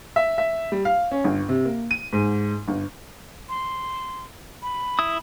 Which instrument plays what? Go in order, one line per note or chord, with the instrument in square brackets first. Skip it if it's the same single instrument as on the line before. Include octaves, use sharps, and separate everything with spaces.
[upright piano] E5
E5
G3
F5
C#4
G1
C3
A#3
D#7
G#2
G1
[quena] C6
B5
[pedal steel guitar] E4 D#6